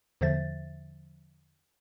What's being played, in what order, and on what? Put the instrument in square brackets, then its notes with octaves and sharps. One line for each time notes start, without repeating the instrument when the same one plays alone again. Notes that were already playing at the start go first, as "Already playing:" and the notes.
[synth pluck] E2 D3 F3 C5 E5 A6